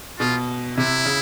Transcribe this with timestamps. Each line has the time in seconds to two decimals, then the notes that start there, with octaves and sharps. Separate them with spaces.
0.19 B2 F4
0.77 C3 E4
1.05 C#3